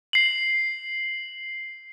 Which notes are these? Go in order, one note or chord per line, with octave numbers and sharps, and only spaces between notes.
C7 F#7